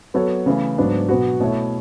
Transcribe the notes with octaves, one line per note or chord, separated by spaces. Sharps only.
F#3 B3 F#4 A4 C#5
C#3 E3 A3
G#2 F#3 B3 D4
B2 F#3 B3 F#4
B2 A3 E4 A4 C#5